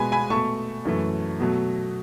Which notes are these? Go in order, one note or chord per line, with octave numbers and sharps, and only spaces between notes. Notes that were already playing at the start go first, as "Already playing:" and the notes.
Already playing: B2 G#3 B4 G#5 B5
G#5 B5
B2 A3 A5 C#6
F#2 E3 A3
B2 F#3 A3